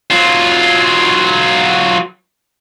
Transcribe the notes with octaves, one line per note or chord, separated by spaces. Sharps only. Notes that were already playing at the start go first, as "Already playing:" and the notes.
F#3 F4